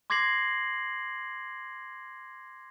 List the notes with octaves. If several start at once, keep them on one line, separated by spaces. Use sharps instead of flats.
C6 D6 G#6 A#6 C7 F#7